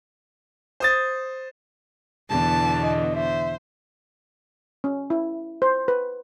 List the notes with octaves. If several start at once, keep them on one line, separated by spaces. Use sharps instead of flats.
C5 D#6 A6
E2 B2 D3 A5
D#5
C5 E5
C#4
E4
C5
B4